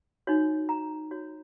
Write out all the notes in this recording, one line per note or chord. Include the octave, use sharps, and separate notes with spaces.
D#4 F#4 C#5
A#5
F#4 C#5